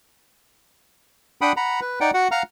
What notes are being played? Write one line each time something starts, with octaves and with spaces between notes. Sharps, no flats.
D4 F#5 G5 B5 D#6
F#5 A#5 B5
B4
D#4 D5 F#5 G5
F#4 F#5
F5 F#5 A#5 F6